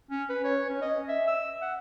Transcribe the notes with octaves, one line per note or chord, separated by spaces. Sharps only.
C#4
B4
C#5
C#4
D#5
E5
E6
F#5